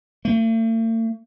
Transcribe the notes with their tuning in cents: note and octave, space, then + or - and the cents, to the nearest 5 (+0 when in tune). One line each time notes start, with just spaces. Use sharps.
A3 +45